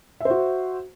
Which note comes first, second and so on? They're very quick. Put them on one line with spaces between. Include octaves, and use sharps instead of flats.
E5 C5 F#4